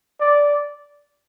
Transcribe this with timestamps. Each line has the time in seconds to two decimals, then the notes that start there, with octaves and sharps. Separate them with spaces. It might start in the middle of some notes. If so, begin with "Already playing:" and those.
0.21 D5